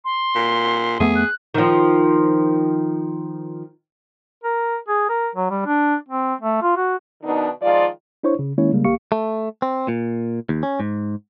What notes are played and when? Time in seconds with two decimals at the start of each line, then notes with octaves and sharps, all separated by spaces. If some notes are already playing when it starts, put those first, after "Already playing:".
0.05 C6
0.36 A#2
1.00 F2 A3 B3 G#4
1.16 F#6
1.54 D#3 F3
4.44 A#4
4.88 G#4
5.09 A#4
5.35 F#3
5.51 G3
5.66 D4
6.09 C4
6.41 A3
6.62 F4
6.77 F#4
7.23 B2 D#3 B3 D4 D#4
7.62 D#3 F3 G#3 F4 D5
8.23 D4 E4 C5 C#5 C#6
8.39 C#3
8.58 D#3 G#3 A#3 C#4 E4 C#5
8.73 C#3 G3 G#3 A#3
8.84 A1 A#3 G4 F5 C#6 C#7
9.12 A3
9.62 C4
9.88 A#2
10.49 D#2
10.63 C#4
10.80 G#2